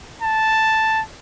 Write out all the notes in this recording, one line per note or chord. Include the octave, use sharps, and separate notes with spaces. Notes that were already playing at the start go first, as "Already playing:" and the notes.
A5